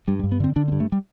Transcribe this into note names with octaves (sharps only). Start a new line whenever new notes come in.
G2 G3
G3
G2
B3
D3 C4
D3 D4
C4
G2
A3
G3